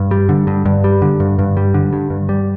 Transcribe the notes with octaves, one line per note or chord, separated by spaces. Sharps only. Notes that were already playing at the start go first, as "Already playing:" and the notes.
Already playing: G2
G3
D3
G2
G2
G3
D3
G2
G2
G3
D3
G2
G2
G3